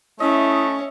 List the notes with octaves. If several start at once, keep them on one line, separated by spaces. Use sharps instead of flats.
A3 C#4 E4 D#5 E5